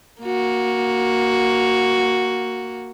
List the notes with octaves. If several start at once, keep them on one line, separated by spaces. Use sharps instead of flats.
A#3 F#4